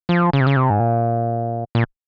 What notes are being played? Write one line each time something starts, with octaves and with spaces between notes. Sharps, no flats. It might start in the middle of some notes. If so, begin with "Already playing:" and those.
F3
C#3
C3
C#3
C3
G#2
A#2
A#2